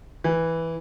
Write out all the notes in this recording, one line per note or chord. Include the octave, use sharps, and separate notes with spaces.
E3